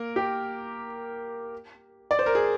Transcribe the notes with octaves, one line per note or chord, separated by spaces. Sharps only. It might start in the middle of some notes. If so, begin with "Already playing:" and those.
Already playing: A#3 A#4
G4
D5
C5
A#4
G#4